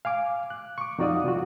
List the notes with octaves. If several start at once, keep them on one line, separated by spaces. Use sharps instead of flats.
F5 G#5 D6
F#6
C#6 D6
F2 D#4 F#4 D5 F5 D#6
C2 F4 F#4